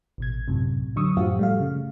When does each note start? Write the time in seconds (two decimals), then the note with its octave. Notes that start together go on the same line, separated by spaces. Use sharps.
0.18 A1 B2 G#6
0.48 B1 F#2 A2 C3
0.96 D3 F#3 C#6 D#6 E6
1.17 F#2 A2 F3 F#4 G4 F5
1.39 G3 A3 F5
1.60 C#3